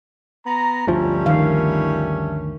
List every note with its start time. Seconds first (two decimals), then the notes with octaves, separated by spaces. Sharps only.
0.46 B3 A#5
0.87 G1 D2 F3 G3 A3 C#4
1.26 D#3 F5